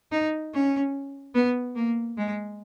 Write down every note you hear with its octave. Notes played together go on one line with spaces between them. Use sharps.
D#4
C#4
B3
A#3
G#3